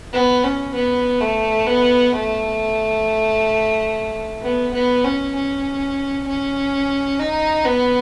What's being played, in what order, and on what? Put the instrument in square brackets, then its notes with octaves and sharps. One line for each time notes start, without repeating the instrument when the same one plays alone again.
[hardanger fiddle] B3
C#4
B3
A3
B3
A3
B3
B3
C#4
C#4
C#4
D#4
B3